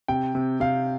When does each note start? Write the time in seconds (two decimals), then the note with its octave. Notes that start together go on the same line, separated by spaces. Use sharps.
0.08 C3 G5
0.35 C3
0.60 C3 F5